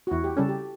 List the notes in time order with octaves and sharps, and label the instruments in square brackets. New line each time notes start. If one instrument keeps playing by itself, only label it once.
[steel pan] F#4
[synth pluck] E2 [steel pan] E4
[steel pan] G4
[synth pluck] C#3 G3 C#4 [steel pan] A4
[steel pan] G4